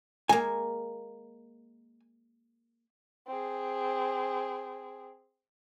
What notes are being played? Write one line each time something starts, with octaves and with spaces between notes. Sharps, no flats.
G#3 A#3 G#5
C4 G#4